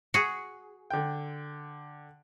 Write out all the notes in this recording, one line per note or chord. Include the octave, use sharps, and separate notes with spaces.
F#4 G#4
D3 G5